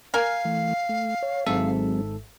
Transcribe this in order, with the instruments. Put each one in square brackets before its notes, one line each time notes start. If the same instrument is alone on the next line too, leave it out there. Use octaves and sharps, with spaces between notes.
[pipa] A#4 G#5 [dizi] F5
[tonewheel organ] E3 A3
A3
C#5
[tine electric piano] G#1 G#2 A4 [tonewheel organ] F#3 G#3 C4 [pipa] E5